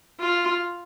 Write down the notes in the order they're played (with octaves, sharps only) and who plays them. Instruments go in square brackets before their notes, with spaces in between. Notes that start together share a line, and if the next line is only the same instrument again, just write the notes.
[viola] F4